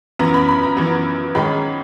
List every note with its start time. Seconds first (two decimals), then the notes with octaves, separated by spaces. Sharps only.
0.19 F#2 E3 B3 A#5
0.34 B5
0.49 B5
0.63 A#5
0.77 F#2 E3 B3
1.35 G#2 D#3 G#3 C#4 B5